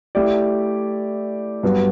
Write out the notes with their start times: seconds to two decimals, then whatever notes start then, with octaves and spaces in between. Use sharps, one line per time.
0.15 A3 E4 G4 D5
1.63 G2 F#3 B3 F#4